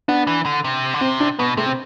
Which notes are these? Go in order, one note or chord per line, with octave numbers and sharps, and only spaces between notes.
B3 D4
E3
D3
C3
D3
C3 C4
D4
B2 B3
C3 A3
C4